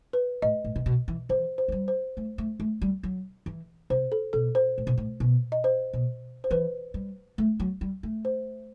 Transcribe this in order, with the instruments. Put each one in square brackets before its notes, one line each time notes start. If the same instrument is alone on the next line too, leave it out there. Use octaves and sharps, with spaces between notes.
[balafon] B4
[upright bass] A2 [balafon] D#5
[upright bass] A2
C3
B2
E3
[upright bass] E3 [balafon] C5
[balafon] C5
[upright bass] A3
G3
[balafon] C5
[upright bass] A3
A3
A3
G3
F#3
E3
[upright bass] C3 [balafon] C5
[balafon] A4
[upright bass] B2 [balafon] A4
[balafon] C5
[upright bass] A2
B2
A2
B2
[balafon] D#5
C5
[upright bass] B2
[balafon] C5
[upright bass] E3 [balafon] B4
[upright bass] G3
A3
F#3
G3
A3
[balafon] C5